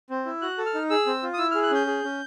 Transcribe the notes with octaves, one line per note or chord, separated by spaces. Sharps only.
C4
E4
F#4 F#6
A4
F6
D#4
G#4 E6
C4
F4
D#6
E4 E6
F6
G#4
F#6
C#4 G6
G#4
C#4